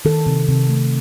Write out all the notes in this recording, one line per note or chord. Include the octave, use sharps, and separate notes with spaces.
D#3 A4
C3
C3
A3